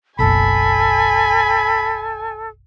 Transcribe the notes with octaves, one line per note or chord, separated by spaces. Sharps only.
F#1 B1 A4 G#5 B5